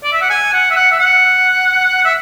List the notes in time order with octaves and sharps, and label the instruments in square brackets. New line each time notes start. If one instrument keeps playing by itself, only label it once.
[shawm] D5
E5
F#5
G#5
F#5
E5
F#5
E5
F#5
E5